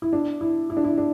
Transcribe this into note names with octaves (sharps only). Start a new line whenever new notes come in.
E4
D4
E4
E4
D4
E4
D4